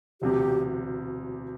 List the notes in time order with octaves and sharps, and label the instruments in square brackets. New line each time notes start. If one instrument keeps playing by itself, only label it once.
[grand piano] E1 D2 C3 [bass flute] G4